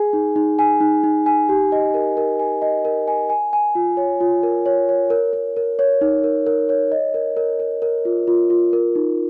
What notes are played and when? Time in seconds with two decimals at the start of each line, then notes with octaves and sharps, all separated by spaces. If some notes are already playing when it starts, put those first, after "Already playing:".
Already playing: G#4 G#5
0.13 D#4
0.36 D#4
0.59 G#5
0.81 D#4
1.04 D#4
1.26 G#5
1.49 G4
1.72 D#5
1.94 A#4
2.17 A#4
2.39 G#5
2.62 D#5
2.85 A#4
3.08 G#5
3.30 G#5
3.53 G#5
3.75 F4
3.97 C#5
4.21 F4
4.43 A#4
4.66 C#5
4.89 C#5
5.10 A#4
5.33 A#4
5.57 A#4
5.79 C#5
6.01 D#4
6.24 A#4
6.47 A#4
6.69 C#5
6.92 D#5
7.14 A#4
7.37 A#4
7.60 A#4
7.82 A#4
8.05 F4
8.27 F4
8.50 F4
8.73 A#4
8.96 D#4